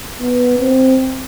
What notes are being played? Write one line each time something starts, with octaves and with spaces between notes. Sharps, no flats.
B3
C4